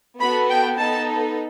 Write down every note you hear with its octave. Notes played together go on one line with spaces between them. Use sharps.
B3 F#4 A4 B5
G5
B3 D#4 A4 A5